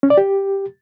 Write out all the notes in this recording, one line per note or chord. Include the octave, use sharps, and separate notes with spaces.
C#4
D5
G4